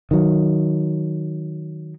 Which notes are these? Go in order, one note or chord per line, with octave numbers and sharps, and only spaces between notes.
D#3 F#3